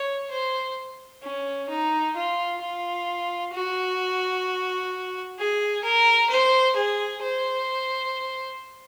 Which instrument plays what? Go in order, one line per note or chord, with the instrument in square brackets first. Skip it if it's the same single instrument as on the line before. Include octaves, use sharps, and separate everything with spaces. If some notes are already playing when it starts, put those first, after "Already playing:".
Already playing: [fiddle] C#5
C5
C#4
D#4
F4
F4
F#4
G#4
A#4
C5
G#4
C5